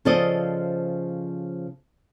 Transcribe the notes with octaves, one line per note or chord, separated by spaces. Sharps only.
C#3 F3 A4 C5 D5 D#5